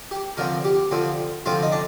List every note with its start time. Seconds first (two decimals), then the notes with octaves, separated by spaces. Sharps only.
0.11 G4
0.37 D3 F3 C4 A#4
0.64 G4
0.91 D3 F3 C4
1.46 D3 F3 C4 F4
1.63 D#4
1.72 D4